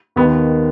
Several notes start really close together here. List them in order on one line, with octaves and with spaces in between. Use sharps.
D#2 B3 D#3